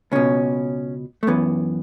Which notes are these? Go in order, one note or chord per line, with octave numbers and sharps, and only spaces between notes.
C#2 B2 C#4
A3
F#2 E3 B3